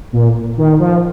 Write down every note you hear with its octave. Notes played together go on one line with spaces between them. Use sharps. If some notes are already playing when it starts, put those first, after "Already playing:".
A#2
D#3
F3